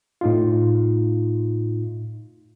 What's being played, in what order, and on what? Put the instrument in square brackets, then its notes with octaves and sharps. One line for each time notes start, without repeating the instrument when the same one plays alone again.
[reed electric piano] A2 D#4 F4